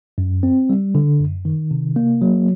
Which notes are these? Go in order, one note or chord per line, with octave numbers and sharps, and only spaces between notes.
F#2
C4
G3
D3
F#2
D#3
C3
A#3
F#3